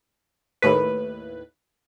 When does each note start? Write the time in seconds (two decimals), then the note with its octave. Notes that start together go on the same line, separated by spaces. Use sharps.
0.62 D#2 A2 B4